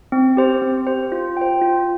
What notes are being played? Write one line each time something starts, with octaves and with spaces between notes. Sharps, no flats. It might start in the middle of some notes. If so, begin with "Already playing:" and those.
C4
G4 C5
C4
G4 C5
F4
C5 G5
F4